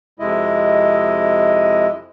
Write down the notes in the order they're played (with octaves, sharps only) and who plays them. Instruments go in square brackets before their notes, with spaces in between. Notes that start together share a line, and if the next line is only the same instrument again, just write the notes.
[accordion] F2 C3 G#3 E4 D#5